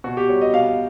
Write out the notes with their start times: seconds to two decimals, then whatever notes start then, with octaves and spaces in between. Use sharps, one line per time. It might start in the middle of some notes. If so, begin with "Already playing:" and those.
0.04 B2 F#4
0.17 G4
0.29 G3 C#5
0.41 D#5
0.53 B2 F5